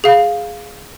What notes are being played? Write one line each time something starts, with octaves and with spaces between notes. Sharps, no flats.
G#4 F5